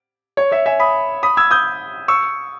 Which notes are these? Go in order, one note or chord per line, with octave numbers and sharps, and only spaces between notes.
C#5
C#5 E5
E5 G#5
B5 D#6
B5 D#6
E6 G#6
D#6 G6
C#6 E6